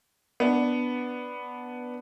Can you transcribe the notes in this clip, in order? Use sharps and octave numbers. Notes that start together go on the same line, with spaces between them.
B3 D4